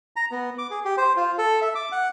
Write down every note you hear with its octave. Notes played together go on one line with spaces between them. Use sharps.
A#5
B3
D6
G#4
G4
C5
F4
A4
E5
D6
F#5